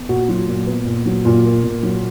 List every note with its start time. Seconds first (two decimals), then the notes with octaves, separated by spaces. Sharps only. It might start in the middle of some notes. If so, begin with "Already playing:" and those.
Already playing: B3
0.09 A#2 F#4
0.28 F#3 F4
0.48 A#2
0.67 B3
0.86 A#2
1.06 F#3
1.25 A#2 F4
1.44 A#3
1.64 A#2
1.83 F#3